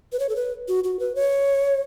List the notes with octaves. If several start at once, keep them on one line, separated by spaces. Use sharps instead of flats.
B4
C#5
A4
B4
F#4
F#4
B4
C#5